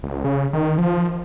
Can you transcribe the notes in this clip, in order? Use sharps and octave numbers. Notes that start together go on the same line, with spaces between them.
C#2
C#3
D#3
F3